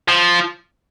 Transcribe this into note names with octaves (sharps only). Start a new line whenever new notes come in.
F3